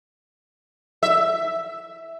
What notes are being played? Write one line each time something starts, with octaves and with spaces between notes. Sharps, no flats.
E5